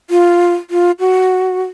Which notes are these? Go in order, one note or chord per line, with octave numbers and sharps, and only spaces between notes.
F4
F4
F#4